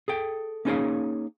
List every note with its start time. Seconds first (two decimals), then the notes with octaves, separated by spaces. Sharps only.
0.08 G#4 A4 G5
0.65 A#3 C#4 D#4 G#4 C#5 F5